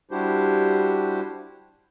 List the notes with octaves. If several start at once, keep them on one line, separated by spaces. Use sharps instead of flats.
G3 D4 E4 F#4 G4 C5